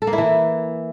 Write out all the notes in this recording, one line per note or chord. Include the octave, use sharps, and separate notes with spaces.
A4
A#3
E4
E3